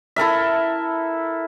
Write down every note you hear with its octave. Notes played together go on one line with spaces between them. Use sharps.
E4 A4 A#4 E5